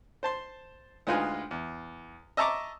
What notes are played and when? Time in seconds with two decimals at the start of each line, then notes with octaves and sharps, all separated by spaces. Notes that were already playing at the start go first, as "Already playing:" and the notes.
0.23 C5 A5 C6
1.07 D2 G#3 D#4 F4 B4 G#5
1.51 E2
2.37 D#5 E5 A5 A#5 C#6 D6